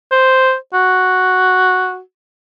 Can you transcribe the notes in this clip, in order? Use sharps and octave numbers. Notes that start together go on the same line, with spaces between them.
C5
F#4